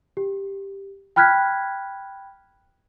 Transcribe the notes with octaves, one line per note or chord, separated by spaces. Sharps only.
G4
G5 B5 F6 F#6 G#6 B6